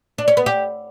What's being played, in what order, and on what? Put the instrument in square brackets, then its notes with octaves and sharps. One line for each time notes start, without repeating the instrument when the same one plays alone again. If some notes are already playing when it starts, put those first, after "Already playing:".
[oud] D4
C#4
B3
G4